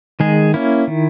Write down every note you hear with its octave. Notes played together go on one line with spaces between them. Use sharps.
D#3 G#3 G#4
A#3 C#4 E4
D#3